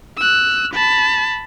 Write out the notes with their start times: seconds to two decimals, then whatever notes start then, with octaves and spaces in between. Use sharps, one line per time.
0.17 E6 F#6
0.74 A5 B5